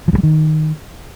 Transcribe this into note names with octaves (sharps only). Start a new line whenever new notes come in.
F3
G2
G3
D#3